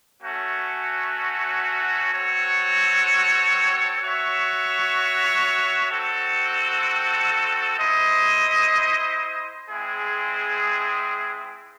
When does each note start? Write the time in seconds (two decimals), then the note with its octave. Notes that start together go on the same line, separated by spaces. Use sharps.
0.21 A3 C#4 F#4
2.11 C4 F#4 A4 C#5
4.00 F#4 C#5 E5
5.90 C4 F#4 A4
7.79 E4 C5 D#5
9.68 G#3 C4 E4 G#4